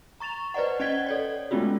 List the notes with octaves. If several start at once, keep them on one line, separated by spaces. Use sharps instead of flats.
A#5 C#6 A6 E7 F7
B4 C5 D5 D#5 F#5
C#4 D#5 F#5 G#6 B6 G7
A4 C#5 D5
G#3 A3 B3 C#4 F4 F#4